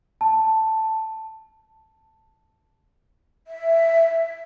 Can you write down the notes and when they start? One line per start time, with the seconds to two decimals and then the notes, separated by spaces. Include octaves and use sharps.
0.21 A5
3.47 E5